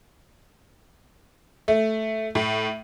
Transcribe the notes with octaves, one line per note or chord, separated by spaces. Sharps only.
A3
A2